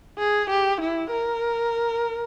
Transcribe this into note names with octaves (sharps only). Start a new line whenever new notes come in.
G#4
G4
E4
A#4